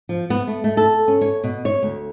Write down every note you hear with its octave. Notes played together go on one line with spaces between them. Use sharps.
F3
B3
A3
A3
A4
C#4
C#5
B2
C#5
D2